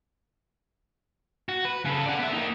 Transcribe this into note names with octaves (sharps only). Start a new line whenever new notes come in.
F#4
B4
C#3 A4
D5 F#5
B3 E5
A#3 D#4